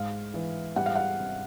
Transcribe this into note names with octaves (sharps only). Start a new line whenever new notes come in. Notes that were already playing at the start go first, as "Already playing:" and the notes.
Already playing: G#2 F5
E3
G3 F#5
F5
F#5
C3